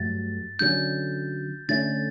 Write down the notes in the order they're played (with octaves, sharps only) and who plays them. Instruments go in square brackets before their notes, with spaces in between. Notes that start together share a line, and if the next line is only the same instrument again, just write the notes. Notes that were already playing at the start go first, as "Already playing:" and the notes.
Already playing: [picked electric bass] G2 F#3 A3 [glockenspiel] A6
[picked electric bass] D3 F#3 C#4 [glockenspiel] G6
[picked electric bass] D3 A3 C#4 [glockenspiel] A6